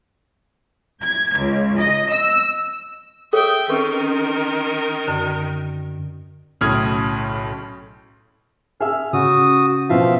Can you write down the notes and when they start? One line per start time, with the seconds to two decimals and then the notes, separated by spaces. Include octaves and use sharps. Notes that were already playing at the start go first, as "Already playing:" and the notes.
1.03 G#6
1.36 C#2
1.78 D#5
2.12 E6
3.33 G#4 A4 C#5 E5 G5 D#6
3.70 D#3 C4 C#4 A#4 B4
5.08 F#2 D3
6.61 B1 A2 C#3 D#6 F6 G#6
8.80 G#4 E5 E6 F6
9.13 C#3 F#4 D#6
9.89 B2 E3 F3 C4 E5 F5